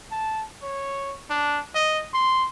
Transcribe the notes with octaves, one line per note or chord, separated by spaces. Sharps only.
A5
C#5
D4
D#5
C6